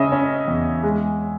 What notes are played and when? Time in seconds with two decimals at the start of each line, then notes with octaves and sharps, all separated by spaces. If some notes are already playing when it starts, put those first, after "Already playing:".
Already playing: C#3 C#4 D#5 E5
0.12 C#4
0.48 E2
0.83 G#3